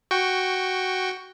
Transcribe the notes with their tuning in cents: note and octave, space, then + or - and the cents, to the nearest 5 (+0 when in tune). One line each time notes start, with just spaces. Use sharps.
F#4 +10 G5 +5 C#6 +0